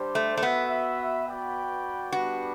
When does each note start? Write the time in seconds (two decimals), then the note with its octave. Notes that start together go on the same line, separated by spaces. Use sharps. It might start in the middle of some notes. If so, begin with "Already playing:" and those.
Already playing: G3 D4 G4 C5
0.15 A3
0.37 A3
0.43 B3 F#4 B4 E5
1.28 F#4 B4 D5 G5
2.12 G3 B3 D4 F#4 G4 B4